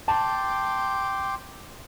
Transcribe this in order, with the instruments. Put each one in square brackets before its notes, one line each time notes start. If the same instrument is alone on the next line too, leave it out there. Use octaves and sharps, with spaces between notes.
[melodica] G5 C6 D6 [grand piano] A5